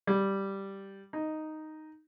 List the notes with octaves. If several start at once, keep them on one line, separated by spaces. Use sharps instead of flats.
G3
D#4